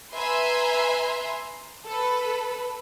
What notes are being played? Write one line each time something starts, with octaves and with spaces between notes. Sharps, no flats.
B4 E5 G#5 A#5 C6
A4 B4